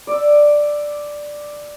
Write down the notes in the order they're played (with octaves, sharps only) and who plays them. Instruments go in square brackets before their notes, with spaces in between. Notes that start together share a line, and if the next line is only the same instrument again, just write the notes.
[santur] D5 E6